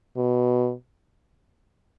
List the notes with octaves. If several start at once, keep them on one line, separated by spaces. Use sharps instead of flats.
B2